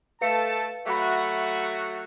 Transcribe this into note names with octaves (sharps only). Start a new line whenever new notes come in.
A3 B4 F5 A5 C#7
F#3 A3 F#4 E5 B5